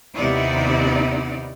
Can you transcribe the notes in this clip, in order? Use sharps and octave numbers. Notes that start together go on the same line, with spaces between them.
D#2 C3 B3 D#4 E4 D5